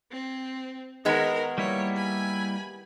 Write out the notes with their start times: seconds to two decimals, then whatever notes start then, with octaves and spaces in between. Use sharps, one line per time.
0.11 C4
1.05 D#3 G#3 B3 D#4 A#4
1.58 G3 A#3 E4 C#5
1.96 G#5 B5